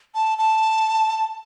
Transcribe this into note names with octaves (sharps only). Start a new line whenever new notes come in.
A5
A5